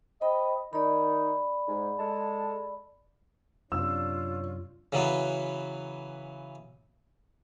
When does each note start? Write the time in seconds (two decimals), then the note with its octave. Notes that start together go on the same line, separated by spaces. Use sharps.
0.21 C5 D#5 G5 B5
0.73 D#3 D#4 D5 B5
1.68 G#2
1.99 G#3 A4 A5
3.72 F#2 C3 D4 F4 C#5 E6
4.92 C#3 E3 F#3 B3